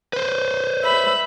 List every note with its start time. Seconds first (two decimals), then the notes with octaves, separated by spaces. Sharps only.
0.13 B4 C5
0.83 E5 B5